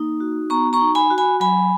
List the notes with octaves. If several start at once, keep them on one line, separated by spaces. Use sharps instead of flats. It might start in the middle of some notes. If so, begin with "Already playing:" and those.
Already playing: A#3 D#4
F#4
B3 A#5 C#6
A#5 C#6
D#4
G#5 B5
F#4
G#5 B5
F#3 G#5 B5